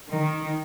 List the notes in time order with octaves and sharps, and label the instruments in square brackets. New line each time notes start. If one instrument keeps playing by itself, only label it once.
[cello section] D#3